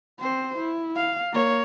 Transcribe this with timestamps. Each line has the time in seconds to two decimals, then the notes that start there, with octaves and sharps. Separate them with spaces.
0.20 C4 C5
0.58 E4
0.96 F5
1.32 A#3 C#5